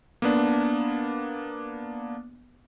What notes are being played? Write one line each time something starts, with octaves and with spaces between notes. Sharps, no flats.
A#3 B3 D4